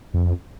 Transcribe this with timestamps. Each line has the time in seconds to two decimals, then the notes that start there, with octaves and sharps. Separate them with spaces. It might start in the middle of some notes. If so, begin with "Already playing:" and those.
0.14 F2